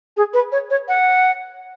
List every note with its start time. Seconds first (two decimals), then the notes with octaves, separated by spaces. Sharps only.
0.17 G#4
0.33 B4
0.52 C#5
0.70 C#5
0.88 F#5